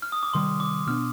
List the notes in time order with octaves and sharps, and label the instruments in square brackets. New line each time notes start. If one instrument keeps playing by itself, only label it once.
[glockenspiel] F6
D#6
D6
[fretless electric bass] C3 D#3 G3 [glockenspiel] C6
[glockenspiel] D6
[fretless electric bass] B2 B3 D4 [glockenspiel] F6